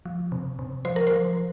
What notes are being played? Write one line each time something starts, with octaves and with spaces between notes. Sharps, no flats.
F3
C3
C3
F3 C5
A#4
F3 C5